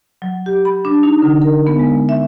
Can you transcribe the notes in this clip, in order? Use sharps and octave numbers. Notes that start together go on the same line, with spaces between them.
F#3
G4
B5
D4
D#4
D3
A#4
B3
G#3
E5